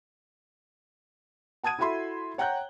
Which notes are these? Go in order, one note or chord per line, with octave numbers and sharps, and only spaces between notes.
F#5 A5 D#6 G#6 D#7
E4 F#4 A4 E5 B5 C6
C#5 F#5 G5 A#5 F#6 G6